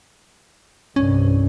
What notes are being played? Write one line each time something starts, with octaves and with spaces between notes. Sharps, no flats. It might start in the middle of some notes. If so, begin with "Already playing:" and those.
C2 G2 C#4